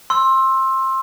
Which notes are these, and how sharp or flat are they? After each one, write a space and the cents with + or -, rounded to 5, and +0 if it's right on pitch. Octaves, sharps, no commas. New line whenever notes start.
C6 +20 E6 +0